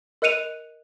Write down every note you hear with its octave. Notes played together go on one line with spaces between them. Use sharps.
A#4 D#5 F#6 C#7 D#7 F7